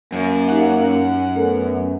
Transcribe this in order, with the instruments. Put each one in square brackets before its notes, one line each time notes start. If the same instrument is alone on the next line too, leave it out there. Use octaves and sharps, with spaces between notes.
[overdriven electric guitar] F#2 [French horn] A#3
[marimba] C#4 D#4 G4 [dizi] F#5
[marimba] A3 A4 A#4 [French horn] B3